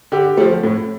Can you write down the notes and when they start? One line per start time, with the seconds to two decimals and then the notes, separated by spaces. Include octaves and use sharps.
0.12 D3 G4
0.37 F3 A3
0.63 A2